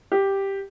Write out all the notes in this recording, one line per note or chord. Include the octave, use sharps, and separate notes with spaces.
G4